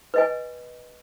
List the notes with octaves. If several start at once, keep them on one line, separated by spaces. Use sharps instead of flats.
B4 D#5 G#5